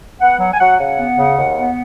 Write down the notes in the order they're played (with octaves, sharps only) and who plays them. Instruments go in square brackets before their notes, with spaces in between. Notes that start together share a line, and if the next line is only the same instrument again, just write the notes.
[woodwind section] B3 F#5
F#3 F#5
G#5
F#3 F#5
C#3 F#5
B3
C#3
D#2
B3